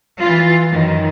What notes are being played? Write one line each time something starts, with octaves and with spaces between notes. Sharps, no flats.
E3 F4
F#2 D#3